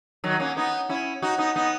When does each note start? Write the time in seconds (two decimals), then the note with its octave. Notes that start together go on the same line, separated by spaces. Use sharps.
0.24 D#3 F#3
0.39 A#3 C#4
0.57 B3 D#4
0.89 C#4 E4
1.22 D#4 F#4
1.38 B3 D#4
1.56 B3 D#4